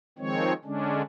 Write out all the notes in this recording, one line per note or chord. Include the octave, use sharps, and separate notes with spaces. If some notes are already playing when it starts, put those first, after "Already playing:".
D#3 F3 G#3 C4 C#5
D3 G#3 C#4 D4